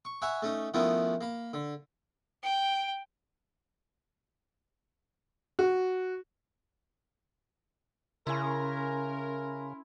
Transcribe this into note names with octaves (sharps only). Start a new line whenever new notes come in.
C#6
C#5 E5 F#5 G#5 B5
A3 C#4 D#4
D#3 F3 A3 B3 C#4 E4
A#3 B5
D3
G5
F#4
C#3 C#4 E4 A#4 G#5 B5 C6